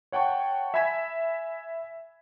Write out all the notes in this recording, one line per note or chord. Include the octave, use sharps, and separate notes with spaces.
C#5 F#5 G5 A5 C#6
E5 G#5 B5 G#6 B6 E7